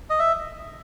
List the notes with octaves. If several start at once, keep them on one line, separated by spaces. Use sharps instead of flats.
D#5
E5